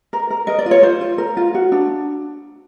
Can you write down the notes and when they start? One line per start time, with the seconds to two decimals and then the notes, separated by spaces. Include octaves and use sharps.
0.13 A#4
0.30 A#4
0.47 A#4 D#5
0.59 D5
0.66 F4
0.71 C#5
0.83 F4 C5
1.01 F4
1.18 A#4
1.37 F4
1.54 F#4
1.72 D4